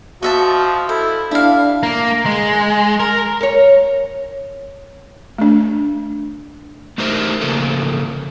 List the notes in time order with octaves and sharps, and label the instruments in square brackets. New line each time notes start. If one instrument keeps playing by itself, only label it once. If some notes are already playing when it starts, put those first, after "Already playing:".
[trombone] F3 [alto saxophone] F#4 [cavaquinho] D#5 E5 A5
[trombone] E4 [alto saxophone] A4 [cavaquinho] C5
[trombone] G3 [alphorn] D4 [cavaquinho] E4 F5
[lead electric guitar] A#3
G#3
A#4
[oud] A#4 C#5
[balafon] A3 D4
[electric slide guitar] A3 D#4 G4 A#4 C5 E5
C#3 F3 A#3 A4